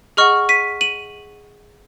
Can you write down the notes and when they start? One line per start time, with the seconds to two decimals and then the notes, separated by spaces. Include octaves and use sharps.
0.17 G#4 D#5 F#5 C#6 F6
0.49 B6 D#7
0.81 D#7 F#7